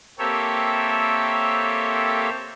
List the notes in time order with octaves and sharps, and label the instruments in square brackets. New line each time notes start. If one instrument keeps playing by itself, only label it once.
[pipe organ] A#3 C4 G4 A4 C#5 E5